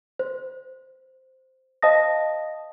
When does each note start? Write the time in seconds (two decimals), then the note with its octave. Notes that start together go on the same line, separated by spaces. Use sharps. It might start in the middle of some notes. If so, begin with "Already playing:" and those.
0.19 C5
1.82 C5 D#5 F5 A5 D#6 A#6